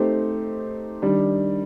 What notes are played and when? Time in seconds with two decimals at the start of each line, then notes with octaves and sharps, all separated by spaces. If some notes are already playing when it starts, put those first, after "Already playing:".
Already playing: A3 C4 D#4 G4 C5
1.02 D#3 G3 D4